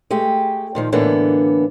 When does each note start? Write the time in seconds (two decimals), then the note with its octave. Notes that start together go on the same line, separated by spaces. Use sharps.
0.10 G#3 A3 G4
0.75 A#2 D#3 F3
0.92 A2 D3 E3 A#3 B3 D4